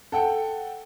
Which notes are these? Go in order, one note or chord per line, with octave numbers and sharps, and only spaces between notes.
A4 F#5 G5